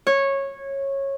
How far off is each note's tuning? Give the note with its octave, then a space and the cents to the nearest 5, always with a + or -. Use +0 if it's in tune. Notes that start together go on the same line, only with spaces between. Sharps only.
C#5 -15